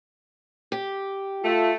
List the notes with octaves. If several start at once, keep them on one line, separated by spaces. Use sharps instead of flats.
G4
A3 F4